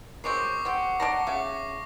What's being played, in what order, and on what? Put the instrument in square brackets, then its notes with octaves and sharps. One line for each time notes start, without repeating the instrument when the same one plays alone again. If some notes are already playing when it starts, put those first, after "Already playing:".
[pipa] F#3 G#3 C4 [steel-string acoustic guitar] A#4 [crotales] C#6 D6 C7
[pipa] C4 G4 [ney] F#5
[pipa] D5 A5 A#5 [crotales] A#6
[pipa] C#3 [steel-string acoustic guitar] E5 F5 A5 [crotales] D6